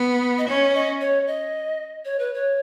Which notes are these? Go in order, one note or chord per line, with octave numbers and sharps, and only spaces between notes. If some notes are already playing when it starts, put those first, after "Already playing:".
Already playing: B3
D#5
C#4 C#5
D#5
C#5
D#5
C#5
B4
C#5